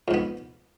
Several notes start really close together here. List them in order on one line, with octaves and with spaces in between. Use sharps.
F2 G#2 B3